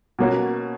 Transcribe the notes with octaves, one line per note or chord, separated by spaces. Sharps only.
B2 A#3 C#4 F#4